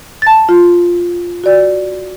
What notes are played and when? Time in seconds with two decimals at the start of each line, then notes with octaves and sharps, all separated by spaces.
0.22 A5 A6
0.49 F4
1.44 F#4 D5